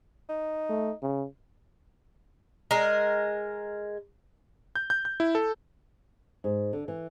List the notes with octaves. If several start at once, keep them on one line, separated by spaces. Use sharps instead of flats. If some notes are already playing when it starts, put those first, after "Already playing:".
D#4
A3
C#3
G#3 A#4
G6
G6
G6
E4
A4
G#2
D3
E3